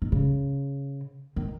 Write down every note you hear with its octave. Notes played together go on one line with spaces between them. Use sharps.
D#3
C#3
D#3